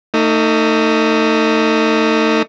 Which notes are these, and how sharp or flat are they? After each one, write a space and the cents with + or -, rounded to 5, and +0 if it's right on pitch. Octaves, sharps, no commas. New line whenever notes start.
A3 +35 D#4 +5